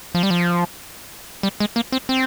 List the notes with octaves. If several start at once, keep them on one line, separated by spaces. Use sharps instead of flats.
F3
G3
F3
G3
G#3
A#3
C4
C4